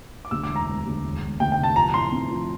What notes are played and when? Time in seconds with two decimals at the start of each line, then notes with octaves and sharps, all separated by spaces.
0.25 D6
0.31 D2 E6
0.43 D6
0.49 E1
0.56 A#5
0.68 E1
0.86 D2
1.04 E1
1.22 E1
1.40 D2 G5
1.52 G5
1.57 C3
1.63 A5
1.76 F3 A#5
1.94 A2 C6
2.12 C4
2.30 F3